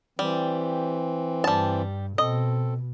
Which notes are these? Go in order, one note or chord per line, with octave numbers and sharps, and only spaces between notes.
E3 G3 C4
G2 G3 A5
B2 C4 A4 D#5